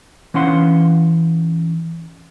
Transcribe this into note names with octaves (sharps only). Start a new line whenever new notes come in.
E3 C#4 F5 F#5 C6